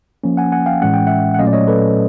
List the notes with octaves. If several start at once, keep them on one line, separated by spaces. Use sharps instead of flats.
F3 A#3 C#4
F#5 G#5
F#5 G#5
F5 G5
A2 E3 G#3 C#4 F#5
G5
E5 F#5
F#5
A#2 F#3 A3 C#4 D#5 F5
D5
C#5 D#5
A4 B4